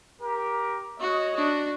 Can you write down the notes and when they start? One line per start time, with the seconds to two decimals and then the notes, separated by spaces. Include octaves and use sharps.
0.22 G4 A#4
1.00 F#4 C#5 D#5
1.36 D4 F#4